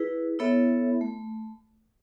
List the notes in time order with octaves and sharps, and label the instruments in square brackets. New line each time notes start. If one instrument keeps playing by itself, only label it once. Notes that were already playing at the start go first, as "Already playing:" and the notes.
Already playing: [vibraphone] E4 G#4 B4
B3 E4 A4 C#5 E5
A3